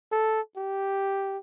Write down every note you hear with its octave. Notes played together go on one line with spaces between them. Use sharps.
A4
G4